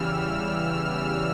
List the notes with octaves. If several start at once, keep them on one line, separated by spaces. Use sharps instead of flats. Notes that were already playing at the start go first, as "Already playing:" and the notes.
Already playing: E2 C#3 E3 G3 E6 F6